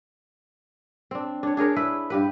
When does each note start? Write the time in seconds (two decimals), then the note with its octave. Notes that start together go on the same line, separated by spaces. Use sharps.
1.11 C4 D4
1.43 D4 C#5
1.57 D4 G#4 A#4 C#5
1.76 E4 B4 E5
2.10 G2 G4 B4